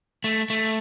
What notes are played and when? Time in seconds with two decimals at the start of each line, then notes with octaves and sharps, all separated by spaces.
0.24 A3
0.50 A3